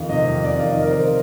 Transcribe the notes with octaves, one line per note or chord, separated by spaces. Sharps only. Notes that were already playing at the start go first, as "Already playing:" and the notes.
Already playing: F2 D#3 F5
C3 D#5
F2
F2 D5
D#3 F5
D#5
C3 A#4
C5